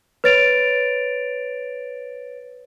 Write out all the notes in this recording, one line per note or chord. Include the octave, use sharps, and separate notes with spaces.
B4 C#5 A6 D7 F7